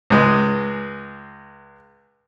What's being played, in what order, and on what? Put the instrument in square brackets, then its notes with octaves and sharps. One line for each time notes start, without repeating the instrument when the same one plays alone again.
[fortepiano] C#2 G#3